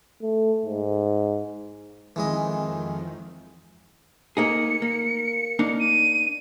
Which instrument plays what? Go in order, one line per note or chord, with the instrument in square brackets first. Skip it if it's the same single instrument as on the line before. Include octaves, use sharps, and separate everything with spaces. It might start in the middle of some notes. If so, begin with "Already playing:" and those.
[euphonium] A3
G#2
[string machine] F2 D#3 [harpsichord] E3 G#3 D#5
[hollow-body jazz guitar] A#3 D#4 G#4 [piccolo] C#7
[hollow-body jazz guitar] A#3
A#3 D4 D#4
[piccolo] D#7